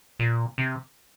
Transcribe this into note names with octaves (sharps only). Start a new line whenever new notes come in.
A#2
C3